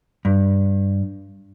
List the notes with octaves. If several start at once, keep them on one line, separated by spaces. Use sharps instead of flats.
G2